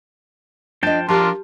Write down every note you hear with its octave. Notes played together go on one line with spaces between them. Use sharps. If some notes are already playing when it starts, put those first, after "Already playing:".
F3 D4 D#5 G5 A5
F3 D4 F4 G4 A#4 A5 C6